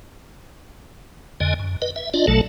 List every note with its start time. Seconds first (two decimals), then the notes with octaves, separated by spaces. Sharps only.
1.40 F2 D3 D#5 G#5
1.60 F#2
1.82 B4 D#5
1.96 E5
2.14 D4 F4 D5 D#5
2.27 A#1 B2 F#3 A3 A4 A5